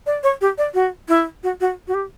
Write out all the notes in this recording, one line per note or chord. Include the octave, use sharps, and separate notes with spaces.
D5
C#5
G4
D5
F#4
E4
F#4
F#4
F#4
G4